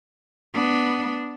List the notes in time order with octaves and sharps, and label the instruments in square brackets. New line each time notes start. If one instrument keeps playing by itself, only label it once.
[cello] B3 D4